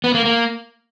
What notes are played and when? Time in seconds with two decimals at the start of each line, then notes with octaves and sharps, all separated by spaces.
0.04 B3
0.14 A#3
0.25 A#3